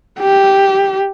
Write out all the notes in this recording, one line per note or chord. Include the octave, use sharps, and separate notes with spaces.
G4